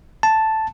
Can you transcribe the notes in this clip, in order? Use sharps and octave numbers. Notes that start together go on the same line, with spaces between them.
A5